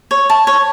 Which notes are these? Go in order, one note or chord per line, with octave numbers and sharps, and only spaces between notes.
C#5
A5
C#5